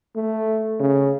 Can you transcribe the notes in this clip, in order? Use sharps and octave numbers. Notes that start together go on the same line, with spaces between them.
A3
C#3